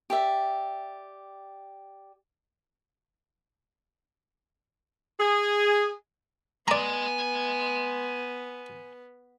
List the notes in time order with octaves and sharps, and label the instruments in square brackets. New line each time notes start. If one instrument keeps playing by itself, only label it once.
[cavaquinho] G4 D5 E5
[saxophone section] G#4
[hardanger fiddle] B3 [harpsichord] D5 A#5 [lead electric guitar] G#5 C6